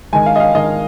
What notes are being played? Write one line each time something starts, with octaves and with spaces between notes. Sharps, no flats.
G#2 D#3 G#5
F5
D#5
F5
G#2 D#3 D#5